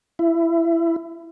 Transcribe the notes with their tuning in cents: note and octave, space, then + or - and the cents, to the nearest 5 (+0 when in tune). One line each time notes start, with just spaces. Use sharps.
E4 +20